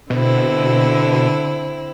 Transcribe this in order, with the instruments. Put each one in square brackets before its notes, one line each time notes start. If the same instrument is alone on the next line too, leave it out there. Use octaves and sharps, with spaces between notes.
[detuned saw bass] B2 [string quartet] D3 C4 E4